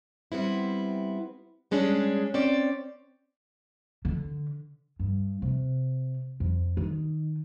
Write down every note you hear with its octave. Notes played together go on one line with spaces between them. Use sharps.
G3 B3 C4 E4
G3 G#3 C#4 D4 G#4
C4 C#4 D5
D3
G2
C3
F2
D#3